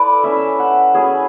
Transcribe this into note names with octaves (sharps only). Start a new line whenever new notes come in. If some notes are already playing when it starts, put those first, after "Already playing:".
Already playing: E4 A4 B4 D5
A3 C#4 E4 E5
F#5
F#3 C#4 E4 G#4